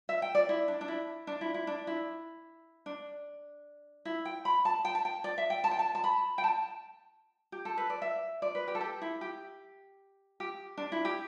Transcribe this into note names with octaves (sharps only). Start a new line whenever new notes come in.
E5
G5
D5
E4
D4
D4
E4
D4
E4
E4
D4
E4
D4
E4
G5
B5
A5
G5
A5
G5
D5
E5
G5
A5
G5
A5
A5
B5
G5
A5
G4
A4
B4
D5
E5
D5
B4
G4
A4
G4
E4
G4
G4
D4
E4
G4